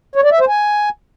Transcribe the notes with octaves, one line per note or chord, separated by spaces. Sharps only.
C#5
D5
E5
C5
G#5